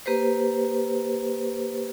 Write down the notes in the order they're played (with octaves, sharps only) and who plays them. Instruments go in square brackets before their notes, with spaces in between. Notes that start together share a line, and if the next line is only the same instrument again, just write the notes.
[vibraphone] A#3 G4 B4 C5